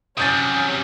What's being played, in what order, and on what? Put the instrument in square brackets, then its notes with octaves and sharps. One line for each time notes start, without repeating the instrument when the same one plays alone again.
[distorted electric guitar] C3 F#3 [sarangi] C#4 [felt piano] D#6 G6 A6